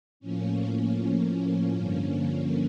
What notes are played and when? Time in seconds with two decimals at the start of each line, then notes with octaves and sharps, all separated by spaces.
0.20 A2 F3 A#3 C#4
1.73 G2 D3 F3 A#3